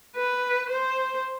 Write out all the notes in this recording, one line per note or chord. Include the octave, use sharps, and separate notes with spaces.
B4
C5